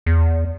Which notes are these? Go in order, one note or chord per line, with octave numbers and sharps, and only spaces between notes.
E2